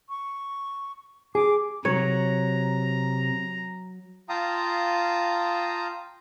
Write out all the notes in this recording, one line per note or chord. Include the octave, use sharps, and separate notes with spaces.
C#6
G#4 D6
C3 F#3 C#5 A#5
F4 F5 G5 A5 A#5 D#6